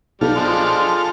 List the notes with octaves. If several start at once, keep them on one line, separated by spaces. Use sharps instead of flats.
B1 G3 F4 A4 F6
F3 G#3 D4